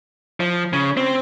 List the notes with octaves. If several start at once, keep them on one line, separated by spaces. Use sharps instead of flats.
F3
C#3
C4